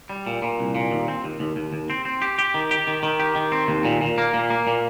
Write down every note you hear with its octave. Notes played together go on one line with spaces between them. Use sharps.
G3
A#2
A#2
C2
A#2
D#2
C4
D#2
D#2
D#2
D#2
C4
C4
G4
G4
D#3
G4
D#3
D#3
G4
D#3
C4
D#2
A#2
A#2
A#3
A#2
A#3
A#2